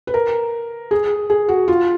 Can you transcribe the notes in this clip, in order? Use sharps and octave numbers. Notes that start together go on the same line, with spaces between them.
B4
A#4
G#4
G#4
F#4
F4